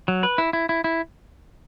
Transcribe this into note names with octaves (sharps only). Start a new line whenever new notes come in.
F#3
B4
E4
E4
E4
E4